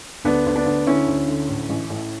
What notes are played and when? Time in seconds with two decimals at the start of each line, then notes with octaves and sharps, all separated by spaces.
0.25 D2 B3 D4
0.46 D2
0.56 B3 D4
0.66 D2
0.87 D3 C#4 E4
1.08 D2
1.28 D3
1.48 A2
1.69 A1
1.90 A2